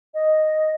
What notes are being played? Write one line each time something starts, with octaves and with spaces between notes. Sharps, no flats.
D#5